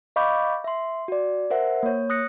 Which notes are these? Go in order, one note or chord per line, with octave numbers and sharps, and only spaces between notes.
D#5 F5 B5 C#6 D6 G6
E5 C6
F#4 D5
A#4 C5 E5 F#5
A#3 C#5
D#6 F#6 A#6 C#7